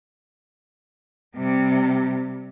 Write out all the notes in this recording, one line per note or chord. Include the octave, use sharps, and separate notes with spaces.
C3 G3